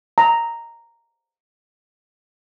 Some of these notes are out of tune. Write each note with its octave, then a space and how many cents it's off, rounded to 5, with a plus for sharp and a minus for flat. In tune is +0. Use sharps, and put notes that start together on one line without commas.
A#5 -5